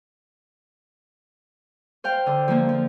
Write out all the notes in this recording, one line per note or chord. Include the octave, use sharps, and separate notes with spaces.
C5 F5 G5
D3
F3 A#3
F3